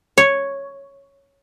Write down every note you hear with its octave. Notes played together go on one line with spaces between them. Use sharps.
C#5